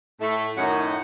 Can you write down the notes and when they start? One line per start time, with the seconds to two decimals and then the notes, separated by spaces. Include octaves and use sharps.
0.21 A2 A3
0.57 F#2 A2 D#3 C#4 D#4 F#4